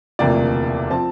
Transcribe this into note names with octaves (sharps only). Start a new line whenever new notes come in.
E1 D2 C3 F3 A#3 D5
F3 C4 A5